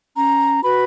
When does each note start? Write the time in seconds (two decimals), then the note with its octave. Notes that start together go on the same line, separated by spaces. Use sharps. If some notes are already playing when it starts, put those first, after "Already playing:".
0.16 C#4 A#5
0.63 F#4 B4 B5